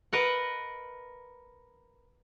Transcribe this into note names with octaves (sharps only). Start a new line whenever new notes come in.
A#4 B4 D#5 F#5